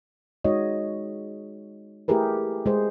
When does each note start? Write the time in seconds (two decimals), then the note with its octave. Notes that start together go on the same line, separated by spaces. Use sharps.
0.44 G#3 D#4 F#4 C#5 D#5
2.08 A3 E4 G4 G#4 A#4 B4
2.66 G#3 G#4 C5